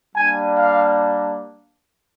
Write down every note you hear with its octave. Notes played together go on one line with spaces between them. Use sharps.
G3 A#3 D4 G#5
F5